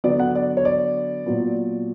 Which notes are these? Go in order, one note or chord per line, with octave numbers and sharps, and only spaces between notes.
D3 F#3 B3 D5
F#5
D5
C#5
D5
A#2 F#3 B3